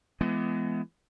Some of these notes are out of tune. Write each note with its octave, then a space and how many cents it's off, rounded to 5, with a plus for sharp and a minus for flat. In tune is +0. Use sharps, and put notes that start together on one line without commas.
E3 +40 G#3 +35 B3 +25